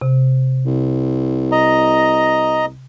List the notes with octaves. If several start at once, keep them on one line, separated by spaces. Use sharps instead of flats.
C3
C2
D#5 A#5